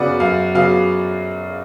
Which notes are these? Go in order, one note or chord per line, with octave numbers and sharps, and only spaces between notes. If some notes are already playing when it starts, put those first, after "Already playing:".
Already playing: F#2 C#3 F#3 B3 D5 F#5
F#2 F5
C#3 F#3 B3 F5